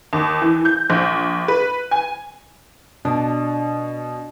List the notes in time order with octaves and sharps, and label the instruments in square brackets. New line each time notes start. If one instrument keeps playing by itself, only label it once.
[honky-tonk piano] D#2
E3
G6
A#1
B4
G#5
[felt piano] B2 [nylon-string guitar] D4